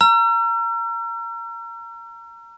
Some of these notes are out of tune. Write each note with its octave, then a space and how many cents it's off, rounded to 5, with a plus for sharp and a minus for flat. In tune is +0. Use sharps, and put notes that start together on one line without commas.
A#5 +0 E6 +45